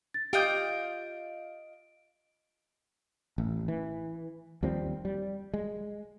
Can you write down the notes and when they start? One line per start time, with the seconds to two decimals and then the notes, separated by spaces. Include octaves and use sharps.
0.14 A6
0.33 F4 G4 D#5 G6 D7
3.38 A1
3.68 E3
4.63 D#2 F3 G3 C4
5.05 G3
5.54 G#3